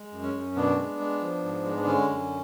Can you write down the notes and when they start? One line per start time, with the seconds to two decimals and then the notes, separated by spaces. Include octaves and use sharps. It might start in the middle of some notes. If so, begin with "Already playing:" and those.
Already playing: G#3
0.12 F#2
0.23 C#4
0.34 F#2
0.56 B2 B3 D4
0.77 G#3
0.99 G#3
1.21 F3
1.43 G#2
1.65 G#3
1.79 D4
1.87 D3 C#4
2.09 F#2